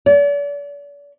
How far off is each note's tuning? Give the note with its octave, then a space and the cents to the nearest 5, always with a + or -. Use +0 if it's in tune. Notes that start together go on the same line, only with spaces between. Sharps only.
D5 -40